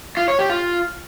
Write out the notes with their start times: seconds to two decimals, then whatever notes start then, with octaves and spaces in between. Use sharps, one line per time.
0.17 F4
0.28 C#5
0.39 G4
0.50 F4